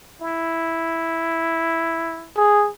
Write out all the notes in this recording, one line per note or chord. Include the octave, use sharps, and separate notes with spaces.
E4
G#4